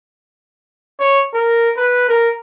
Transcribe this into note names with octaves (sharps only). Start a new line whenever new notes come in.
C#5
A#4
B4
A#4